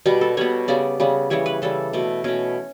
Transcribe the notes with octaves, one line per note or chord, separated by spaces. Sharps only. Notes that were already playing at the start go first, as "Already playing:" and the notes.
B2 G3 B3
A4
B2 G3 B3 C#5
C#3 G3 B3 D5
C#3 G3 B3
C#3 E3 G3 C#5
B4
C#3 E3 G3 A4
B2 A3
B2 A3 C#4